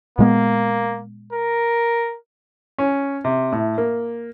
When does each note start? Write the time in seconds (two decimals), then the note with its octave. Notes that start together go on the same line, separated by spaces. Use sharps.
0.19 A#2 G#3 A#3 B3
1.33 A#4
2.79 C#4
3.25 C3
3.52 A2
3.78 A#3